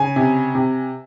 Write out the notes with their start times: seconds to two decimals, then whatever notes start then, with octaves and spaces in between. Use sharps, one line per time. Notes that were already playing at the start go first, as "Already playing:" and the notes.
Already playing: C#3 G#5
0.16 C3
0.55 C3